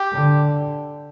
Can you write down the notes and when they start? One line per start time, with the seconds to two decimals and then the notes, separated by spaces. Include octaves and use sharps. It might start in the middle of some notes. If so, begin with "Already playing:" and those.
Already playing: G4
0.13 D3